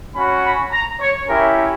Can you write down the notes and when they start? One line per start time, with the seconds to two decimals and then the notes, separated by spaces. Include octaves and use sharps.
0.14 C#4 F#4 B5
0.43 B5
0.71 A#5
1.00 C#5
1.28 C#4 E4 G4 A#4